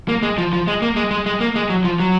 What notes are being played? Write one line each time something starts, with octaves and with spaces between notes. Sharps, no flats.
A#3
G#3
F3
F3
G#3
A#3
G#3
G#3
G#3
A#3
G#3
F#3
F3
F#3